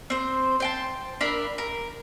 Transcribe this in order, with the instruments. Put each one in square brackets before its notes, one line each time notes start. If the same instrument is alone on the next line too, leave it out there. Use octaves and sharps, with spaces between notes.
[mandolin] C4 C5
C5 G5 A5
D4 A#4 E5 B5
A#4